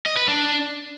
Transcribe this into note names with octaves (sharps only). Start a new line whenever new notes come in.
D#5
B4
D4